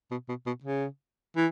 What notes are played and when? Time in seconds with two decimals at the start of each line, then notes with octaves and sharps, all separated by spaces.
0.11 B2
0.29 B2
0.47 B2
0.64 C#3
1.36 E3